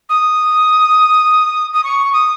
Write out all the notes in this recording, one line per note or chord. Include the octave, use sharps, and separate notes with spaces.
D#6
D#6
C#6
D#6